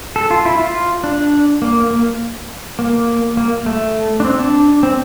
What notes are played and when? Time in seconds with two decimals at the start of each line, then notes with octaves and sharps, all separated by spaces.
0.16 A4
0.31 F4
0.46 E4
0.59 F4
1.04 D4
1.62 A#3
1.91 A#3
2.79 A#3
3.37 A#3
3.66 A3
4.20 D4
4.25 C4
4.39 D4
4.83 C4